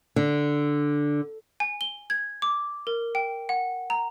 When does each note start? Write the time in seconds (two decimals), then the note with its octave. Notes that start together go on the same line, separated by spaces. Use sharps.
0.16 D3
1.60 G#5
1.81 G7
2.10 G#6
2.42 D6
2.87 A#4
3.15 G5
3.49 F#5
3.90 A#5